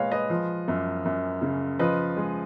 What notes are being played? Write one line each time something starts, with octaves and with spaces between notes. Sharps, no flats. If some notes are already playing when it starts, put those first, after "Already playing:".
Already playing: A#2 G#3 B4 C#5 D#5 F5
B4 D#5
F3
F#2
F#2
C#3
F3 B4 D#5
G#3